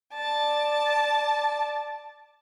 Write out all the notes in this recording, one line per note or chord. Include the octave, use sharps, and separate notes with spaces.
D5 A5